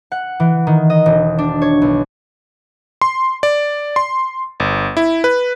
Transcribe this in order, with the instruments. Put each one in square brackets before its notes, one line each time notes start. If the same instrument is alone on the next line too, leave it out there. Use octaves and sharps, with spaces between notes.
[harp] F#5
E3
D#3
D#5
E1
D4
C#5
B1
[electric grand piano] C6
D5
C6
G1
E4
B4